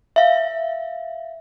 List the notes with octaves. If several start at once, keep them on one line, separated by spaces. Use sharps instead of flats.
E5 F5